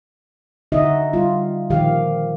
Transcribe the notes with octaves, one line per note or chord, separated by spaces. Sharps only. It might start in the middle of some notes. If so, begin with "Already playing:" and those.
D3 D#4 F#4 D#5 E5
G3 F4
A#2 D#3 F3 G4 F5